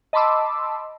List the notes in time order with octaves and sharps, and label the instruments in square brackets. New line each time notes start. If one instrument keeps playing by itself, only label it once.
[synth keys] D#5 A5 B5 C6 D6 E6